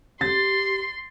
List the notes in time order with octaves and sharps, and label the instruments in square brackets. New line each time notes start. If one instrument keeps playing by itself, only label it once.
[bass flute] G4 [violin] C6 [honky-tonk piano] A6